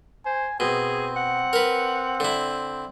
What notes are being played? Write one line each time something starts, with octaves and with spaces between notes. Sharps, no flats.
C5 G#5
B2 C4 G#4
F#5
A#4 B4
D3 E4